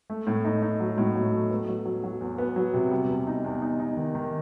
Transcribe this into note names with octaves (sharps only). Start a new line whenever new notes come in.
A3
A2
D#4
D#4
F#3
A2
F#3
A3
B3
F#3
F#3
F#3
E2
B3
F#3
C3
G3
E2
D#4
E2
D#4
D#4
D#3
D#3